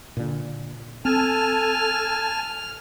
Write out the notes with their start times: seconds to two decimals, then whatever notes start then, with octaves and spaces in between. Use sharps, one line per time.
0.17 A#2 D3
1.05 C4 A4 G#5 A5 F6